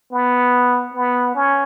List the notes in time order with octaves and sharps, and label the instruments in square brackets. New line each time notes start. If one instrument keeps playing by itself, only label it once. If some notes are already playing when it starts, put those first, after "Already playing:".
[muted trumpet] B3
B3
C#4